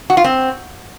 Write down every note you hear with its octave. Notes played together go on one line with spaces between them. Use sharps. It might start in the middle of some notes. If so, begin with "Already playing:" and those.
F#4
F4
C4